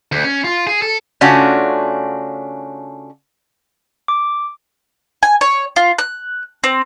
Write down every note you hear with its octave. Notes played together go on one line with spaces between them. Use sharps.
D2
C#4
F4
G#4
A4
C#3 A3 C#4 D4 F4 F#4
D6
G#5
C#5
F4
F#6
C4